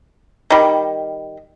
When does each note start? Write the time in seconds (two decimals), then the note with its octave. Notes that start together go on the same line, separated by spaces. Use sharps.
0.50 D#3 G3